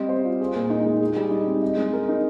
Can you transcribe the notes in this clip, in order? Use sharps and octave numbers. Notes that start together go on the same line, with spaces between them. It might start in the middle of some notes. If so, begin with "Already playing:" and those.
Already playing: G3 C4 D#5
C5
F4
G#4
A#2
D#4
G#3
G#4
G3
D#4
C4
D#5
G#3
A#4
D#4